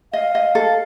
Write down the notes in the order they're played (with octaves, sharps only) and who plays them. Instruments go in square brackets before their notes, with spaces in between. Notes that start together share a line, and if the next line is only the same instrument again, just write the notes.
[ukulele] D#5 [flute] F5
[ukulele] D#5
A4